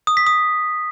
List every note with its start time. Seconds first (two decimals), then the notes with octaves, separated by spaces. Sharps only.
0.07 D#6
0.17 B6
0.27 D#6